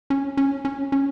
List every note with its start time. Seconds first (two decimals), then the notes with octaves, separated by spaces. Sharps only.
0.10 C#4
0.37 C#4
0.65 C#4
0.92 C#4